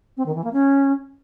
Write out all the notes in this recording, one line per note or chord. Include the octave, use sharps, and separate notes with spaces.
C4
D#3
E3
A#3
C#4